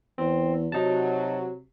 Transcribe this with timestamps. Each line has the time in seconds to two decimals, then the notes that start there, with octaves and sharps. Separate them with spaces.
0.18 E2 C4
0.72 C3 F#3 D#4 A5